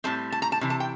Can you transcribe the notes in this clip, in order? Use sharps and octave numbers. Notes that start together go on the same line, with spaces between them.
A2 G3 C4 A5
A5
A#5
A5
C3 E3
A5
G5